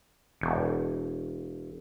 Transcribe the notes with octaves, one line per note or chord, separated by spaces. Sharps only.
E1